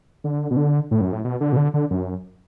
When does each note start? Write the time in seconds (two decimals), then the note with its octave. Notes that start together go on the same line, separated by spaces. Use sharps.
0.24 D3
0.51 B2
0.57 D3
0.91 A2
1.01 F#2
1.13 A2
1.24 B2
1.41 D3
1.52 B2
1.57 D3
1.74 D3
1.91 F#2